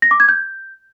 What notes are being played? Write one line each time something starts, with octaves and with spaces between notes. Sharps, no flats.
A#6
D6
G#6
G6